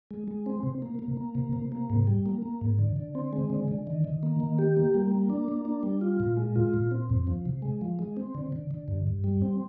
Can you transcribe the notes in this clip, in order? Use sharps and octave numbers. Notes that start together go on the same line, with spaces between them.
G#3
G#3
C4
C3
A#3
A#3
A#3
C3
C3
A#3
G#2
G3
A#3
A#3
G#2
D3
D3
C4
G#3
D3
D3
D#3
D#3
A#3
D#3
G4
A#3
G3
A#3
D4
A#3
D4
G3
F4
A#2
G#3
F4
A#2
C4
F2
F3
C3
G#3
F3
G#3
C4
D3
D3
D3
G2
G2
G3
C4